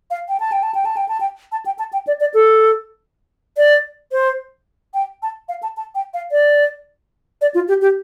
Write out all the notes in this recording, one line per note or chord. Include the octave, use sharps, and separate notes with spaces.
F5
G5
A5
G5
A5
G5
A5
G5
A5
G5
A5
G5
A5
G5
D5
D5
A4
D5
C5
G5
A5
F5
A5
A5
G5
F5
D5
D5
F4
G4
G4